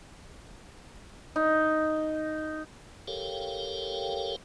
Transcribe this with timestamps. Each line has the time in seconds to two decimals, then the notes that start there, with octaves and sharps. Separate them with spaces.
1.36 D#4
3.08 G4 A4 A#4 C#5 F5 G5